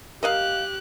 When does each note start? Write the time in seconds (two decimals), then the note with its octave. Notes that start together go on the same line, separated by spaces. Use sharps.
0.23 G4 A#4 D#5 F5 F#6